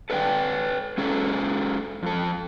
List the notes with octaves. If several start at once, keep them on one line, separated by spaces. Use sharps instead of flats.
A4 B4 D5 G5
G#3 C#4 G#4 A4
F2 A4